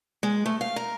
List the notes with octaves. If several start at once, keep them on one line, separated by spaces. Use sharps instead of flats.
G#3
A3
F5
A#4